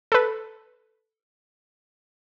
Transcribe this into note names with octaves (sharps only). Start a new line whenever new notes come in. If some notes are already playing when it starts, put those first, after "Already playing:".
A4 B4